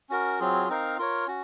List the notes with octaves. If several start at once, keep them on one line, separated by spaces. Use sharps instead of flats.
C#4 F#4 A#4
F#3 C4 F4 G#4
C4 D#4 A#4 F5
F4 A#4 C#5
C#4 F#4